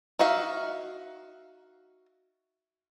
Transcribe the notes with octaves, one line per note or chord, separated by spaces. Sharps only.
D#4 F#4 E5 F5